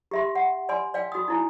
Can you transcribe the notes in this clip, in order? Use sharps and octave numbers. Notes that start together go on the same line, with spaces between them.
G4 E5 C6
F#5
D5 G#5 C6
D5 F5 G5
F#4 D#6
D#4 E4 G#5